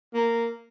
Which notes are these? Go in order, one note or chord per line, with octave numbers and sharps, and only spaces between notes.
A#3